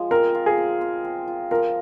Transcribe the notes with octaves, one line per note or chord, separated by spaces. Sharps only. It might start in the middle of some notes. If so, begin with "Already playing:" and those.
Already playing: F3 G#3
C4 A#4
F4
G#4
C5
C4
C4
F4
F3 A#4